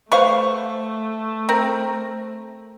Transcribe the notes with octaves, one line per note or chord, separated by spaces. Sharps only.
A3 B4 C5 F5 F#5 C#6
C4 A#4